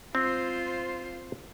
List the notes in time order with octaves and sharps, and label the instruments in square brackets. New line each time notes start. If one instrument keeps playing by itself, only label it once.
[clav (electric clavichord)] C4 [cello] F4 C5